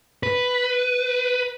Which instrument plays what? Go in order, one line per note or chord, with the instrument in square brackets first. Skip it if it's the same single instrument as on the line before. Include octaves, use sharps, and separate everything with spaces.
[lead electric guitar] B4